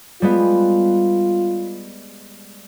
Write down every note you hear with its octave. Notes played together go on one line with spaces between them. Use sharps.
G3 G#3 B3 F4